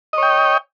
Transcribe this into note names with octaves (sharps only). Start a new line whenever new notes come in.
C#5 D#5 G5